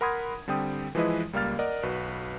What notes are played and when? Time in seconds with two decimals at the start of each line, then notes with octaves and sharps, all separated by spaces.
0.01 A#4 F#5 B5 C6 D#6 G#6
0.48 D3 G3 C4 G5 D#6
0.95 E3 F3 G#3 E4 B4 D#5
1.33 C#2 G3 A#3 F5 F6 A6
1.59 A#4 D5 D#5 F#5
1.83 B1 F#4 B4